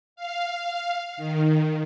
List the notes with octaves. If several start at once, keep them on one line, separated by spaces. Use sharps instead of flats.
F5
D#3